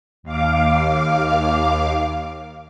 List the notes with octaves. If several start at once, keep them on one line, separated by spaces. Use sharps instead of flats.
D#2 F5 D6